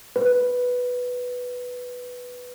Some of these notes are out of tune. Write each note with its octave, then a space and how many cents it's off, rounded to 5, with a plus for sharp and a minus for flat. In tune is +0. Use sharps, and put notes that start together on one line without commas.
B4 +0